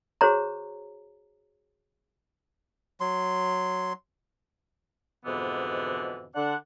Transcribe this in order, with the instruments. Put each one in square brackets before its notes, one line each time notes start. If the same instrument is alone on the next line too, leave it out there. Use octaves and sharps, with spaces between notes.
[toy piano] F#4 G#4 C5 C#5 A#5
[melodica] F#3 C6
[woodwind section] F2 G#2 B2 D3 E3 B3
D3 D4 F#5